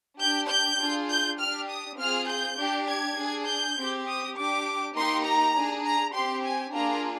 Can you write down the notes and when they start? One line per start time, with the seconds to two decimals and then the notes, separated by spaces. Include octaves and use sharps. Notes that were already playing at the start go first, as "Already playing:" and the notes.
0.20 D4 G4 G6
0.50 G6
0.80 D4 F4 G#4
1.10 G6
1.39 G4 F6
1.45 D4
1.70 D#6
1.99 C4 F4 G#4 F6
2.29 G6
2.59 D4 G4
2.89 G#6
3.19 D4 G#4
3.48 G6
3.78 C4 G4
4.08 D#6
4.38 D4 G4 D6
4.97 A#3 D#4 G4 C6
5.26 A#5
5.56 D4 G#4
5.85 A#5
6.15 C4 G4 C6
6.45 G#5
6.75 A#3 D4 F4 G#4 A#5